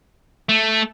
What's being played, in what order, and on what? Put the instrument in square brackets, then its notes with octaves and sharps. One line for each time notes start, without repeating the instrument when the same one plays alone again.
[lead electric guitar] A3